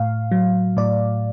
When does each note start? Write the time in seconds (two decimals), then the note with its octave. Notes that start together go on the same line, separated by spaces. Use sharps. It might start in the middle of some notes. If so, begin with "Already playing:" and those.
Already playing: A2 F5
0.32 F#3
0.77 A2 D5